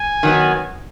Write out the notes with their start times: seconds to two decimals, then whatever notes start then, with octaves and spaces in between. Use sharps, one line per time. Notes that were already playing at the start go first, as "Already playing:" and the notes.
Already playing: G#5
0.23 D#3 F#3 B3